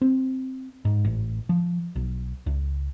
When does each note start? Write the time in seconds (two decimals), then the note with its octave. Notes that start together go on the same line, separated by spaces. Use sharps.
0.01 C4
0.85 G#2
1.04 A1
1.49 F3
1.96 B1
2.46 C#2